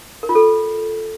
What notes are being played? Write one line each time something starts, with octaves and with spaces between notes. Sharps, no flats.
A#4
F4
A4